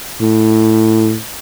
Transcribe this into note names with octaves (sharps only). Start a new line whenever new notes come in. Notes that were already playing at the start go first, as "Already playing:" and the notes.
A2